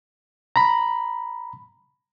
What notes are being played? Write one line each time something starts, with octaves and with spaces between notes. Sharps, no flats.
A#5 B5